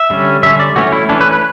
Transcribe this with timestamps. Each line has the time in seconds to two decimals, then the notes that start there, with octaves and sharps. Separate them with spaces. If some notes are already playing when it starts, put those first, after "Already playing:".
Already playing: E5
0.10 D3 G3 C#4
0.43 D3 G3 C#4 E5
0.60 D5
0.76 E3 A3 C#4 F#4
0.92 E4
1.09 E3 A3 C#4 D4
1.21 B4
1.31 B4